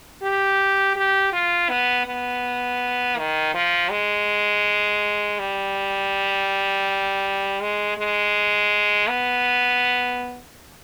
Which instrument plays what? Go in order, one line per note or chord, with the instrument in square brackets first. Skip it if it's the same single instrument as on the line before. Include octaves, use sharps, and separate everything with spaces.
[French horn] G4
G4
F4
B3
B3
D#3
F3
G#3
G3
G#3
G#3
B3